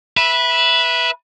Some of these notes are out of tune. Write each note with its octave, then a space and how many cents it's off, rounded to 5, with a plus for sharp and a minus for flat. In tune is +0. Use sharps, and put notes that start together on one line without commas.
B4 -15 E5 +0